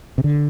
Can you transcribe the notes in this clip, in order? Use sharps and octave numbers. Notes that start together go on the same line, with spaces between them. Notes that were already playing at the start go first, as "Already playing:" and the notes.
C3
D3